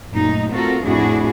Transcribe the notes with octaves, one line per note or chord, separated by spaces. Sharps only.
F#2 A#2 A3 D#4
A3 C4 F4 F#4 A4 A#4
F2 A2 D4 E4 F#4 G#4